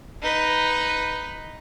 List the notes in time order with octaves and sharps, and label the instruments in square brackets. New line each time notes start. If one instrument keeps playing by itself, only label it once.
[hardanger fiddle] D#4 B4